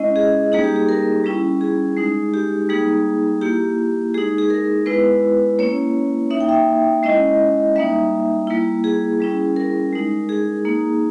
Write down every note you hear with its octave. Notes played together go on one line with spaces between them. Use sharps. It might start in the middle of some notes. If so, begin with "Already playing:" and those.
Already playing: G#3 C#4 E4 D#5
G#4
G3 A#3 D#4 G#4
G4
G#4
A#4
G3 C#4 E4
G#4
G#3 D#4
G4
G3 A#3 D#4 G#4
A#3 E4 G4
G#3 D#4 G#4
G#4
A#4
G#3 B3 E4 B4
A#3 C#4 E4 C#5
A#3 D#4 E5
G5
E5
G#3 C#4 E4 D#5
G3 A#3 D#4 E5
G3 A#3 E4
G#4
G3 C#4 E4
A#4
G#3 D#4
G#4
A#3 D#4